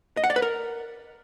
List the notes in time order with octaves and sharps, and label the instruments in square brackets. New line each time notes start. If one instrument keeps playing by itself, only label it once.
[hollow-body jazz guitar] D#5
F#5
D5
B4
A#4